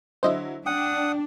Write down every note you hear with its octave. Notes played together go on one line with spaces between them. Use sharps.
D3 F#3 E4 C5 D#5 E5
D4 F#5 G5 D#6